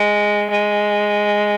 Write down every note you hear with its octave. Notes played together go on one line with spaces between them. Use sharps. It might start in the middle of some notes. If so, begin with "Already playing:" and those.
Already playing: G#3
G#3